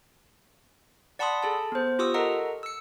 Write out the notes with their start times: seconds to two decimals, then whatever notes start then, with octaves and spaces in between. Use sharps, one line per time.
1.19 D5 F#5 A5 B5 C6 D#6
1.43 G#4 A4 A5
1.72 B3 C5
1.99 F4 G4 C#6 D#6 E6
2.14 A4 A#4 D#5 F#5 A#5
2.63 E6 C#7